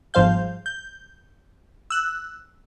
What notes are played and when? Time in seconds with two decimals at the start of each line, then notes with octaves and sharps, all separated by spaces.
0.14 G1 G#2 F3 C5 F5 G6
0.66 G6
1.90 E6 F#6